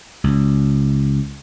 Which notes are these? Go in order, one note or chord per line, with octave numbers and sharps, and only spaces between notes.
C#2